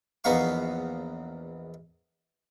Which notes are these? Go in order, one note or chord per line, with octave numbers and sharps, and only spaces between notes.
A#1 E2 B3 D#4 F5 C#6